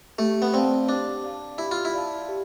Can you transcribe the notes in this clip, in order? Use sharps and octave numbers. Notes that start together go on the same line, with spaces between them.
A3 G4
B3
C4 D5 F5 A5
D4 G4
D5 F5 A5
E4 G4
F4
E4
D5 F5 A5
G4